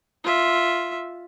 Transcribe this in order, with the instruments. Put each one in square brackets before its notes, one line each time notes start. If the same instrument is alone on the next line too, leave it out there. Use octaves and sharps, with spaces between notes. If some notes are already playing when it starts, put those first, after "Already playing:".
[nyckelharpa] F4 E5